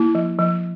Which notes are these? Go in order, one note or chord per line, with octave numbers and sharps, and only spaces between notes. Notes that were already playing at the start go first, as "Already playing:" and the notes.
Already playing: A#3 E4
F3
F3